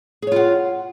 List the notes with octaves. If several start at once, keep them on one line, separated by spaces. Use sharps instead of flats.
F4 G#4 C#5 F#5